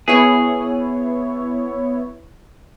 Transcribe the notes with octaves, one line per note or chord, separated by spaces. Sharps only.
B3 E4 G#4 C#5